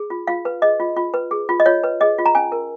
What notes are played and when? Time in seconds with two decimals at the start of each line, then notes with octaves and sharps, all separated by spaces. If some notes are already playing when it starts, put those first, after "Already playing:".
Already playing: G#4
0.10 F4
0.27 F4 F5
0.45 B4
0.62 G#4 D#5
0.80 F4
0.96 F4
1.14 B4
1.31 G#4
1.49 F4
1.60 D#5
1.66 F4 C#5
1.84 B4
2.01 G#4 D#5
2.18 F4
2.26 A#5
2.35 C#4 G#5
2.52 A#4